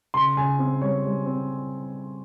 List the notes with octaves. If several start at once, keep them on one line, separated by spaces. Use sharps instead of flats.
C#3 C6
C#3 G#5
C4
G3 C#5
G3
C4